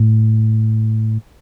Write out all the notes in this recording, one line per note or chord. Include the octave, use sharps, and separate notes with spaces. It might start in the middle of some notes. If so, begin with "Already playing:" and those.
Already playing: A2